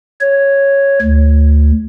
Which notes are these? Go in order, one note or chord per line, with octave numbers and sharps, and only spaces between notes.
C#5
D2